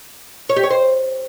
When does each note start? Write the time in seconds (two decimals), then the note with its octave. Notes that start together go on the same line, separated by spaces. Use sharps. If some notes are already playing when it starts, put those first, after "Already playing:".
0.49 C#5
0.56 G4
0.63 C#5
0.70 C5